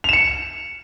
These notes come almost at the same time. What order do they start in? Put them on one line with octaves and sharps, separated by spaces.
F7 E7 C#7